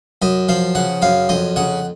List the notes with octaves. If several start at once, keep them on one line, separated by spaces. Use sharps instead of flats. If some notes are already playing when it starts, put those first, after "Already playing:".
F#2 D#5
F3 F5
C#3 F#5
F#2 F5
F2 D#5
C#3 F#5